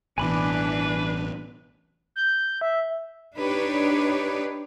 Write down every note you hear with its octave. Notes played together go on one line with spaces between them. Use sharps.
A1 B2 E3 D4 B4 G#5 B5 D6
G6
E5
D4 D#4 G4 B4 C#5 D5